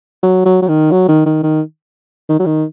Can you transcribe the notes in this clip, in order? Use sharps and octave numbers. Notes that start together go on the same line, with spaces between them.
F#3
F#3
F#3
D#3
F#3
D#3
D#3
D#3
D#3
F#3
D#3